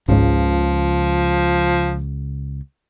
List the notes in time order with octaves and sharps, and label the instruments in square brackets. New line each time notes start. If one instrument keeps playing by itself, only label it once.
[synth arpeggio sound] G#1 G#2 [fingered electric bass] C#2 C#3 [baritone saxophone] F3